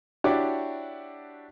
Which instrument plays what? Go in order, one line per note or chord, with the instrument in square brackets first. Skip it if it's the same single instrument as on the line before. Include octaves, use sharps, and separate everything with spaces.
[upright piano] D4 E4 F#4 G4 C#5 D5